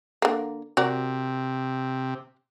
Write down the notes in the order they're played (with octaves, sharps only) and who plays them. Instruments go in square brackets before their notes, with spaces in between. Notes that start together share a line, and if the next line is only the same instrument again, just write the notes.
[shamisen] D3 A#3
[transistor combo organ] C3 [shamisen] F#4 A#4 D5